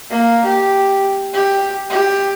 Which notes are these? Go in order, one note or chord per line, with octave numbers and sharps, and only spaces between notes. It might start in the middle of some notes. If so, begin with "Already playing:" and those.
A#3
G4
G4
G4